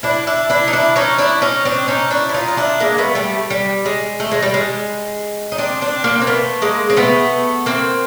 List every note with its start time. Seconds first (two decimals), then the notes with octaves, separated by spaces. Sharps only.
0.03 D4 E4
0.27 D4 E4
0.50 D4 E4
0.68 D#4
0.73 D4 E4
0.96 C#4 D#4
1.18 D4 E4
1.42 C#4 D#4
1.65 C4 D4
1.88 C#4 D#4
2.11 D4 E4
2.29 E4
2.34 D#4 F4
2.48 F4
2.57 D4 E4
2.80 G#3 A#3
2.98 A3 B3
3.15 G3 A3
3.50 G3
3.86 G#3
4.20 A3
4.31 G#3
4.42 G3
4.54 G#3
5.52 D#4
5.58 C4 D4
5.82 C4 D4
6.04 A#3 C4
6.22 C4
6.27 A3 B3
6.62 G#3 A#3
6.90 C4
6.97 A3 B3
7.66 A#3 C4